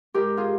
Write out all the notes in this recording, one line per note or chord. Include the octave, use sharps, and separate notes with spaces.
G#2 G4 A#4
F4 G#4